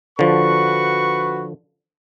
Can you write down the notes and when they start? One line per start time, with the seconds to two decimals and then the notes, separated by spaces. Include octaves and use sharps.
0.19 D3 F3 F#4 B4 C#6